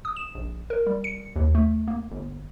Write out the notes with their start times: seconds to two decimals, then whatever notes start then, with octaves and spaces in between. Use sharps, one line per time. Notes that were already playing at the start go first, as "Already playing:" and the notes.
0.05 D#6
0.16 E7
0.35 A#1
0.70 A#4
0.86 G3
1.04 C#7
1.36 D#2
1.55 A3
1.88 A#3
2.11 G1